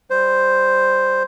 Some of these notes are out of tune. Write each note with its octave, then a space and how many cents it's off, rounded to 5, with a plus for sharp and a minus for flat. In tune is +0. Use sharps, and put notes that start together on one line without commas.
G3 +0 C5 +0